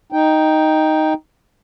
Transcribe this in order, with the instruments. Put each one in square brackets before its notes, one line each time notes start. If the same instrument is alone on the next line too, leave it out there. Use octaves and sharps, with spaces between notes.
[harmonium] D#4 G5